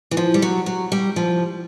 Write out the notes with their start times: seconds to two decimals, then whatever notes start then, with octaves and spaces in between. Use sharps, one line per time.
0.11 E3
0.17 F3
0.34 G3
0.42 F#3
0.66 F#3
0.92 G3
1.16 F3